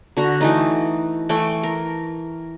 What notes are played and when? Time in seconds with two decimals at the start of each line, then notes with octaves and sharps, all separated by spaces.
0.17 D3 F#4 A#5
0.41 E3 A3 D#4
1.29 E3 A3 G5 C#6
1.63 A#4